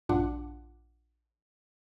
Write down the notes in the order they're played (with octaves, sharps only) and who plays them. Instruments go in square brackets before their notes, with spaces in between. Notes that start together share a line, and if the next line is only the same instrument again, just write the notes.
[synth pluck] A#1 G2 D4 F4 F#5 D6